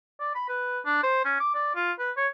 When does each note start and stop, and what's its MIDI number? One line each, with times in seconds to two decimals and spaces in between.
0.20 0.33 74
0.35 0.45 83
0.49 0.79 71
0.85 0.99 62
1.03 1.23 72
1.25 1.40 61
1.40 1.55 86
1.55 1.73 74
1.75 1.92 65
1.99 2.11 71
2.17 2.27 73